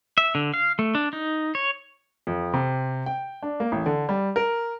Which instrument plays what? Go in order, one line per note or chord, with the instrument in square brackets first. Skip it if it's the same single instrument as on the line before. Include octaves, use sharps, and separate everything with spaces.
[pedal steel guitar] E5
D3
F5
A3
D4
D#4
C#5
[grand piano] F2
C3
G5
D4
A#3
A1
D3
G3
A#4